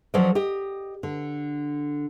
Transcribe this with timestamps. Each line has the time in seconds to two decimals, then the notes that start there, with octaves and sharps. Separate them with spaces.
0.14 F3 F#3 C#4 A4 D5 D#5
0.35 G4 D#5
1.03 D3